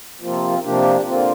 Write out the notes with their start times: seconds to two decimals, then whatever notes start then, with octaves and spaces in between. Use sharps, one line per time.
0.21 C3 F3 A#3 C4 F4
0.63 C3 F3 A#3 D4 G4
1.06 D3 A#3 C4 F4